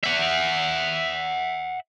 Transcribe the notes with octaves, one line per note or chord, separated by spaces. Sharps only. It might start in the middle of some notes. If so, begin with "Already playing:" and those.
E5 F#5